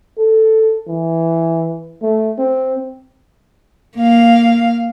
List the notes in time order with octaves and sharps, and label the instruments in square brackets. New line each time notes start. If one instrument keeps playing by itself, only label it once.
[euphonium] A4
E3
A3
C4
[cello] A#3 F5